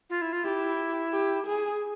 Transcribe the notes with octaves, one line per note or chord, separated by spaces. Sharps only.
F4
E4
F4
E4 G4
G4
G#4